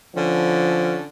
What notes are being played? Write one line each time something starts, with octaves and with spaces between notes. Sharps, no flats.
D3 F3 C#4